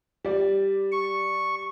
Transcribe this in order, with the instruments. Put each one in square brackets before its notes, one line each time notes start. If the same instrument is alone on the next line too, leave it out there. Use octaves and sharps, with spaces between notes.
[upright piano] G3 D5
[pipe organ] C#6